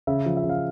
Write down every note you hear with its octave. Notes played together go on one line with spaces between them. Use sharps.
C#3 E5
F3
E5
C#3
F5